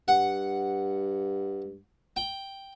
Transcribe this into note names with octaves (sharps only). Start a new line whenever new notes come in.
G2 F#5
G5